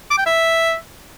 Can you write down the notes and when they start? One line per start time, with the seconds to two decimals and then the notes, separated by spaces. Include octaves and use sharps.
0.10 D6
0.18 G5
0.26 E5